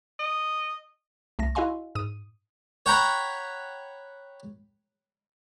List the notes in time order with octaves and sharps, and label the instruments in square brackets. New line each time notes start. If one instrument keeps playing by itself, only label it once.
[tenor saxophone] D#5
[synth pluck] C2 A3 A#6
E4 F#4 D#5 F5 G#5 C6
G#2 D#6 D#7
[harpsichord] C#5 F#5 G5 A#5 B5